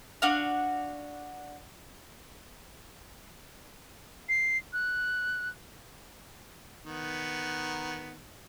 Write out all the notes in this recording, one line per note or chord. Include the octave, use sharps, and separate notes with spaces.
D4 F#4 F5
C7
F#6
D#3 B3